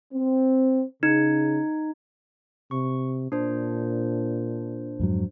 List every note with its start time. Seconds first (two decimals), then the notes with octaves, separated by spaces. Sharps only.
0.14 C4
1.03 C#3 D#4
2.71 C3 C#6
3.32 A#2 D4 C5
5.00 F2 G#2 F#3